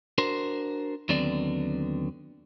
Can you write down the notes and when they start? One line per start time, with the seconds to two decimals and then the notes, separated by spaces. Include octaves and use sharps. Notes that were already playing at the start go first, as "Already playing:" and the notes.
0.18 D4 F#4 A#4 C5
1.09 D#2 D3 F#3 B3 C4 D5